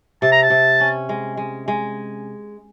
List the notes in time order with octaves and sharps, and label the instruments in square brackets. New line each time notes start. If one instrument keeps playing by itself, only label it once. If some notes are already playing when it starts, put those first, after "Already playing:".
[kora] C3 [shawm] A5
[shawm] A#5
A5
[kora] C3
C#4
G#3
G#3
G#3